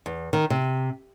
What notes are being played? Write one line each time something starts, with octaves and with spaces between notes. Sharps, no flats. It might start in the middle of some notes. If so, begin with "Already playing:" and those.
E2
D#3
C3